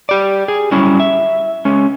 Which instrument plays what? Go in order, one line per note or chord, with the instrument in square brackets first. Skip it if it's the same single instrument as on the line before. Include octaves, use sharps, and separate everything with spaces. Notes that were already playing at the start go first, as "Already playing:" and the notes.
[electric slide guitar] G4 D5
G#4
F#3 G3 C#4 E4
E5
G#3 C#4